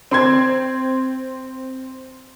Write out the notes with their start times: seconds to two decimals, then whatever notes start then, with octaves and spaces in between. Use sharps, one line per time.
0.11 C4 C6 G#6